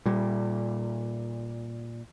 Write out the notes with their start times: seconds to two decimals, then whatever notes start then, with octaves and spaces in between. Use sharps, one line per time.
0.06 A#2 G3